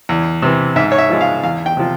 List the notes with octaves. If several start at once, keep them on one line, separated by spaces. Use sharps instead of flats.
E2
C3 E3
G#2 E5
C#5
E5
F3 G#3
F5
E2 F5
G5
C3 F3